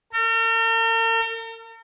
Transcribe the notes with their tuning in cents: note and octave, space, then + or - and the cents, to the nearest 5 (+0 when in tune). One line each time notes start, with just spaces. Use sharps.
A#4 -45